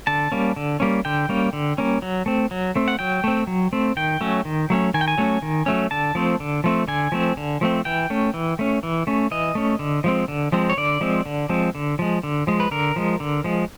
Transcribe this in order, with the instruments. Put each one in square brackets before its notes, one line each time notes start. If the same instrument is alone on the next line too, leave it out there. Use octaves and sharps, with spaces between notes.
[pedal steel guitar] D3 A5
G3 A#3 C#4
D3
G3 A#3 C#4
D3 G5
G3 A#3 C#4
D3
G3 A#3 C#4
F#3
A3 C4
F#3
A3 C4
F#5
F#3 G5
A3 C4
F#3
A3 C4
D#3 G5
F#3 A3 C#4
D#3
F#3 A3 C#4
D#3 G#5
G5
G#5
F#3 A3 C#4
D#3
F#3 A3 C#4
D3 A5
F3 A3 C4
D3
F3 A3 C4
D3 G#5
F3 A3 C4
D3
F3 A3 C4
E3 G5
A3 C#4
E3
A3 C#4
E3
A3 C#4
E3 D#5
A3 C#4
D3
F3 G#3 C4
D3
F3 G#3 C4
C#5
D3 D5
F3 G#3 C4
D3
F3 G#3 C4
D3
F3 G#3
D3
F3 G#3
B4
D3 A#4
F3 G#3
D3
F3 G#3